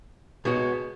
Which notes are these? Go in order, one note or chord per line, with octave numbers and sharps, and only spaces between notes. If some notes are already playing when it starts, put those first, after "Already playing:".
C#2 B2 G#3 B3 F#4